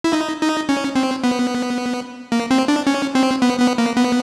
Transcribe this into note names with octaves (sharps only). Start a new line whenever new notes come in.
E4
D#4
D#4
C#4
C4
B3
A#3
C4
D4
C#4
C4
B3
B3
A#3
B3